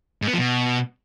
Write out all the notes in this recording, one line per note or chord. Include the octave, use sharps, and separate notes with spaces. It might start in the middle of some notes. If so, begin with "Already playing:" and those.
G#2
B3
F3
B2